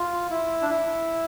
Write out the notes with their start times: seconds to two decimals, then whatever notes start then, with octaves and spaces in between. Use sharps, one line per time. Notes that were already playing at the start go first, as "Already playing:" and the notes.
Already playing: F4
0.31 E4
0.62 D4
0.70 E4